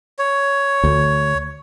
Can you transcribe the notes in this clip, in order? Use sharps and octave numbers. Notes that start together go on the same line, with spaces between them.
C#5
D2